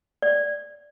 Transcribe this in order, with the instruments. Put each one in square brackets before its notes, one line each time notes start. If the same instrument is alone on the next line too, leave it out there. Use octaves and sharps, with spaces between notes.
[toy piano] D5